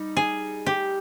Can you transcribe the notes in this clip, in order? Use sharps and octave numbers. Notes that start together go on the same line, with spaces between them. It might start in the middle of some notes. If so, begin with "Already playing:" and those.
Already playing: G3 D#4
G#4
G4